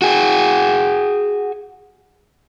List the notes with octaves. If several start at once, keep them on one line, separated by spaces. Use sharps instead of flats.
F#4 G#4